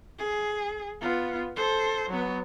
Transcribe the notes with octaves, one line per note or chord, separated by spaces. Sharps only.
G#4
B3 F4
A4 C5
F#3 B3